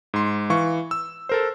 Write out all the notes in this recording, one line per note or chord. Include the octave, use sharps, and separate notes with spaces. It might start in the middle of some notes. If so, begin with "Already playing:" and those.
G#2 C6
E3 F5 C#6
E6
A4 A#4 C5